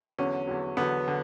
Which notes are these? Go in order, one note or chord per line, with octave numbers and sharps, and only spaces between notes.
E2 D3 F#3 C#4
E2 D3 F#3
E2 D3 F#3 B3
D3